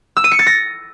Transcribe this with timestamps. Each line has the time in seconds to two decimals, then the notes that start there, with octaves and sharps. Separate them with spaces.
0.17 E6
0.24 D#7
0.32 C#7
0.39 A6
0.46 A#6